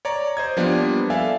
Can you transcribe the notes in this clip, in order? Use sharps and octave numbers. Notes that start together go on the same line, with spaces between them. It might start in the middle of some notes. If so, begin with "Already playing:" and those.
C#5 D5 A#5
C5 D#5 G#6
F3 G3 A#3 B3 D4
A4 D5 E5 F5 G#5